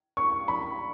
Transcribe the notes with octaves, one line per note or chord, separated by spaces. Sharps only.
C#6
B5